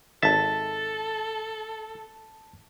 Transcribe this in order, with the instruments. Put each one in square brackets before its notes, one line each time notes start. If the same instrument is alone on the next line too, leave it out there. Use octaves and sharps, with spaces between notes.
[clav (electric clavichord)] G#1 E5 [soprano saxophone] A4 [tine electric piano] A5 A6